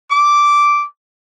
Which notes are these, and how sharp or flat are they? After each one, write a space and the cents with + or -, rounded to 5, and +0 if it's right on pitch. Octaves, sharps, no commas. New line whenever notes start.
D6 -5